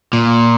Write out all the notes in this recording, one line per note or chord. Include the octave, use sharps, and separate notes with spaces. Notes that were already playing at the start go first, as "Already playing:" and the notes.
A#2